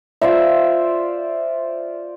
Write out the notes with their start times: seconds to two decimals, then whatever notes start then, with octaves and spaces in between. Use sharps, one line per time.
0.22 F4 C5 D5 E5